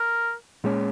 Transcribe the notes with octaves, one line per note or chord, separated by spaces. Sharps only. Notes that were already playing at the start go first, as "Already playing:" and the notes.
Already playing: A#4
A#2 G#3 C#4